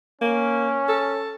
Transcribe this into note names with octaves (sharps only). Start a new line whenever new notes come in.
A#3 C#4
A4